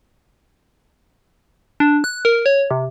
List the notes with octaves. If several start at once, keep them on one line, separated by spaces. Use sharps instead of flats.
D4
F#6
A#4
C#5
C3